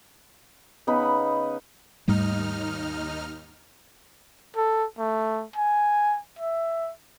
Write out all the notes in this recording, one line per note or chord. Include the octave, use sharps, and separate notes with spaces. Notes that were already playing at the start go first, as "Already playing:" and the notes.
C#3 B3 D#4 B5
D#2 G#2 G3 A3 D#4 F6
A4
A3
G#5
E5